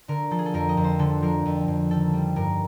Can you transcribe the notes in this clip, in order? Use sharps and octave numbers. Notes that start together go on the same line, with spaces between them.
D3 A#4
F3 A4
G#4
A4
F2 A#4
D#5
F2
C5
D3 A4
F3 A#4
F2
F2
D#3 A4
G3
G2 A#4